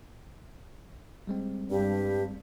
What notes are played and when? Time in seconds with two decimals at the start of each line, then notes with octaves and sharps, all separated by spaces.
1.27 G3 G#3 C4
1.70 G2 G4